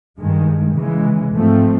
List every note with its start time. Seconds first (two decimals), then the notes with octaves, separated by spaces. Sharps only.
0.19 G2 D#3 G#3
0.76 C#3 E3 G#3
1.33 G#2 F3 A3 C4